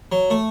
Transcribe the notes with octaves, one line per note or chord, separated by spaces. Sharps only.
F#3
A3